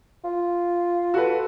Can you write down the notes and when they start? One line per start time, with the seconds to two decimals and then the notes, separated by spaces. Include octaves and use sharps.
0.24 F4
1.14 F#4 A4 B4